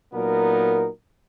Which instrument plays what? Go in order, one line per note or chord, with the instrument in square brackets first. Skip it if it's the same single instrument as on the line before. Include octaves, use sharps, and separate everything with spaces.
[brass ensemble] A#2 F#3 B3 D#4 A#4